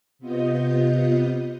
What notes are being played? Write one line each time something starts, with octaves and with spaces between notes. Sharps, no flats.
C3 B3 F4 D#5 G6